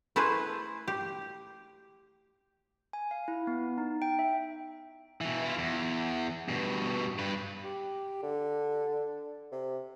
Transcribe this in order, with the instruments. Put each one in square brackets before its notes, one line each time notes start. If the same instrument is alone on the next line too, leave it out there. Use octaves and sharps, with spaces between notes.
[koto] A3 E4 G#4 B4 C5
G4
[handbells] G#5
F5
E4
B3
D#4
G5
E5
[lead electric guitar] B2 E3
E4 F4
E2
G2 B2
G2 B4
[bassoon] G4
D3
C3